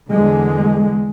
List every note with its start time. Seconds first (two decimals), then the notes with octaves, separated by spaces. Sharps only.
0.10 E2 D3 G#3